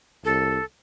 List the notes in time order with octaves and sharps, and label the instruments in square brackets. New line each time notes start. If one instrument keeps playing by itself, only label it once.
[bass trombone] C2 [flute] A4